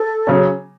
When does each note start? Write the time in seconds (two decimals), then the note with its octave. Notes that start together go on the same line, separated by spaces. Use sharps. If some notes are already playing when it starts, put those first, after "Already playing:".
Already playing: A4
0.27 C#3 F#3 C#4